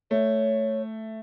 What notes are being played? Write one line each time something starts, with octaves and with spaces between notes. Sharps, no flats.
A3 C#5